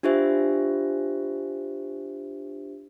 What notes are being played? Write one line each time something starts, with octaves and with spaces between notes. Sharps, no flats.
D4 F4 G4 C5 E5